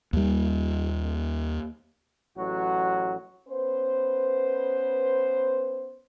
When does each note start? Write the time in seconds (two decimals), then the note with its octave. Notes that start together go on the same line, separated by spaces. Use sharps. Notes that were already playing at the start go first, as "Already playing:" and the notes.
0.13 D#2 G3
2.36 A1 F#3 F#4
3.48 B3 C#4 B4 C5